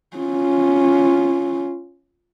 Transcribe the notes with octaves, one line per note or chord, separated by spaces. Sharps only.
C#4 F4